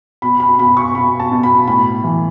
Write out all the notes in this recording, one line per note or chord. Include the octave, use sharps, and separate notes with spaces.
B2 B5
B5
B2 B5
C#6
B2 B5
A5
B2
B5
A2 B5
E3